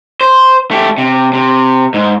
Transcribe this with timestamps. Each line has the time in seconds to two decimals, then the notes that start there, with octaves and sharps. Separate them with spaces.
0.21 C5
0.71 A3 G4
0.98 C3
1.33 C3
1.94 G#2